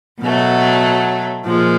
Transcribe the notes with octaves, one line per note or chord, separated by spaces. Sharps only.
B2 F#3 A3
A#2 F3 G#3